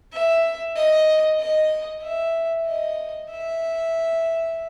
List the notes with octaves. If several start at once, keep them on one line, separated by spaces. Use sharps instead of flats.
E5
D#5
D#5
E5
D#5
E5